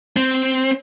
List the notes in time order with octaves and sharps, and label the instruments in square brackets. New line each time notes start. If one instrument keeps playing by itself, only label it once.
[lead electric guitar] C4